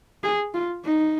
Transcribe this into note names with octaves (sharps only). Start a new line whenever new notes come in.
G#4
F4
D#4